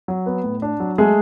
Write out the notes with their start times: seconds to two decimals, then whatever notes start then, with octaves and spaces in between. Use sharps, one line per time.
0.08 F#3
0.26 B3
0.44 A2
0.62 D4
0.80 F#3
0.98 G#3 A3 G#4